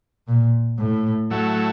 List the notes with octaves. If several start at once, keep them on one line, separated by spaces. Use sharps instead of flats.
A#2
A2
A2 F#3 A3